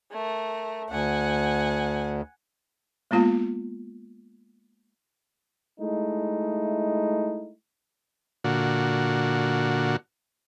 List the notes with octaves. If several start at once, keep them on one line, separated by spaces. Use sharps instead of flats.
A3 A#4
D2 F#5 G#5
G#3 A#3 B3 F4 F5
G#3 A3 D#4 E4
A#2 D3 F#4